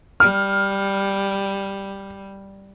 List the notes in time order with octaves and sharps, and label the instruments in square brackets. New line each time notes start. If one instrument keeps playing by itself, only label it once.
[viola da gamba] G3 [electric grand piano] F6